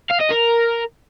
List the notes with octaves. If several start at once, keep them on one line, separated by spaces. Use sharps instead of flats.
F5
D#5
A#4